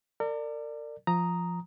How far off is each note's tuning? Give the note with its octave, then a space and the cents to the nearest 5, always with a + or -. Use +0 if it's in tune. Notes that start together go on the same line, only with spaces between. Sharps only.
A#4 -40 D5 +10
F3 +0 A#5 +0 D#6 +0